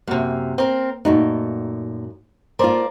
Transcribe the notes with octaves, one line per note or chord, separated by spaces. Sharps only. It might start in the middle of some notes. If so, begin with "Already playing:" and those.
F#2 C3 A#3
C4 A#4
F#2 A#2 A3 D#4
A3 A#3 F4 A#4 C5 D5